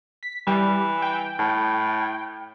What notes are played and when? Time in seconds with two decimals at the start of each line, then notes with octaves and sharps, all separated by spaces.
0.23 B6
0.47 E3 G3
1.02 G5
1.39 A2